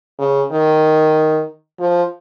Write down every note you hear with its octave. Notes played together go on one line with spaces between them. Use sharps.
C#3
D#3
F3